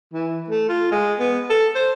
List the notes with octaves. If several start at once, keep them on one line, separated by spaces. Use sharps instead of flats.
E3
A3
F4
G#3
B3
A4
C5